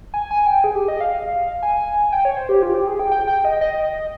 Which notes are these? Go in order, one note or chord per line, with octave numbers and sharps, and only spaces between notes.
G#5
G#5
G5
G#4
G4
D#5
F5
G#5
G5
C#5
C5
G4
F4
G4
G#4
G5
G5
G5
D#5
D#5